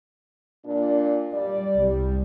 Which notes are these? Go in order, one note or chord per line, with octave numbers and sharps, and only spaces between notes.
A#2 D4
G3 D5
C2 G3